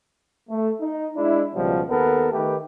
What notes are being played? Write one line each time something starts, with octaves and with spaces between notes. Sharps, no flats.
A3
D#4
G#3 D4 E4
C#2 B2 F3 G3
D#2 B3 A4 A#4
D#3 A3 G4 B4